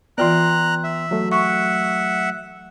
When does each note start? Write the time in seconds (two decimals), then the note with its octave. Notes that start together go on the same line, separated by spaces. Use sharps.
0.18 E3 B3 F4 D5 G5 A#5 C6 F#6
0.84 E5
1.11 F#3 A3
1.32 E5 F#5 C#6